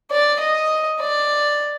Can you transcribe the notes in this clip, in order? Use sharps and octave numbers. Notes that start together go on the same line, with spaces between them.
D5
D#5
D5